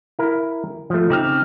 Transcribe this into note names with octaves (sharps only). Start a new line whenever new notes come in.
E4 A#4
F3 A3
C#3 C4 D#4 G4 F6